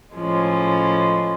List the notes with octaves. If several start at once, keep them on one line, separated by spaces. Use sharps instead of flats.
A2 F3 G#3 C#4